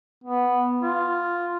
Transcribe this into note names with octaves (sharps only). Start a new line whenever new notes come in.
B3
F4